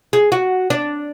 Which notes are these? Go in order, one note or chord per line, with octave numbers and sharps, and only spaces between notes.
G#4
F#4
D4